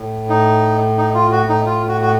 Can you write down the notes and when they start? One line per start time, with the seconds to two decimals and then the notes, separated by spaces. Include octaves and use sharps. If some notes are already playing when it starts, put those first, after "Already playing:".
Already playing: A2
0.29 D#4
0.98 D#4
1.15 F4
1.32 F#4
1.49 D#4
1.66 F4
1.88 F#4
2.02 F#4